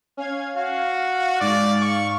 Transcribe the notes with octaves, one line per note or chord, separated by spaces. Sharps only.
C#4 F5 G#6
F#4 F5
G#2 D5 F5
C#6